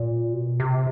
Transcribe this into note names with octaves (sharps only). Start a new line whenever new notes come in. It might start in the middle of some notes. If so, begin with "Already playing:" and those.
Already playing: A#2
B2
C3